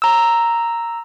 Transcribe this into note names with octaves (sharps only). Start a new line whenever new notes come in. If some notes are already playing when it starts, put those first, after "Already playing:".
A#5 E6